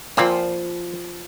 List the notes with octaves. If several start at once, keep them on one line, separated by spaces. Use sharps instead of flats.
A#2 F3 A#3 C4 B5 C6